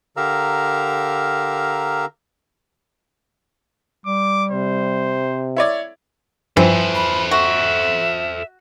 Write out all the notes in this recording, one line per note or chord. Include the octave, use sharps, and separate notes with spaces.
D3 G4 A#4 F5 A#5 E6
G3 D6
C3 C5
E4 C#5 D5
G2 E3 F3 C4 A4 C5
B5
F#4 E5